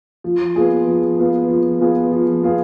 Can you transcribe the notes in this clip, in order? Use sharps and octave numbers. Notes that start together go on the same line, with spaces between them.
F3
B3 F4 G#4
F3
B3 F4 G#4
F3
B3 F4 G#4
F3
B3 F4 G#4